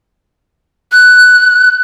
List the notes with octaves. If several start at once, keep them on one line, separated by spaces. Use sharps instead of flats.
F#6